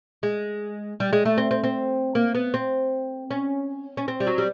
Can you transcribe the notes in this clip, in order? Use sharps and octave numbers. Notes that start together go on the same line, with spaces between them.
G#3
G3
G#3
A3
C4
C4
C4
A#3
B3
C4
C#4
C#4
C4
G3
F#3
G3